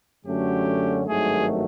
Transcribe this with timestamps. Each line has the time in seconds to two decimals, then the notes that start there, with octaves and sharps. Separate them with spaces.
0.24 F#2 D3 F#3 A3 C#4 G4
1.07 G#1 G2 D#3 F#3 A3 G#4